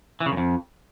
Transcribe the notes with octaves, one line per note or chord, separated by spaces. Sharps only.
E3
C#3
F#2
F2